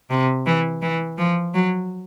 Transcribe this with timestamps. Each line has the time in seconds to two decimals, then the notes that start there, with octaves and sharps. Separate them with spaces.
0.10 C3
0.46 E3
0.82 E3
1.18 F3
1.54 F#3